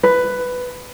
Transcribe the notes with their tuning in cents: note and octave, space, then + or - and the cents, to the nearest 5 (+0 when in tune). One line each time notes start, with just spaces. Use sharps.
B4 +10